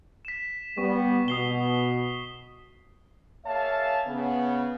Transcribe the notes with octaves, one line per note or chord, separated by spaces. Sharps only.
B6 E7
G3 B3 C#6
B2 D#6 C7 G7
A#3 G#4 C#5 E5 F5 A5
C#3 B3